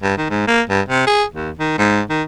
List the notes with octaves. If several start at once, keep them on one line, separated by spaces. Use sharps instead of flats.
G2
D#3
G#2
A#3
G2
C3
G#4
D#2
D#3
G#2
D#3